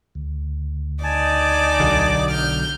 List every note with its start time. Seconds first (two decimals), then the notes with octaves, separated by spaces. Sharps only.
0.15 D2
1.04 D#4 D5 G#5 A5 D6
1.80 B1 D3 F#3
2.31 F6 G6